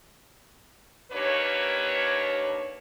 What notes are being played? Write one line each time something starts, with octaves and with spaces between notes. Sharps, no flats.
D#2 A#3 D4 B4 C#5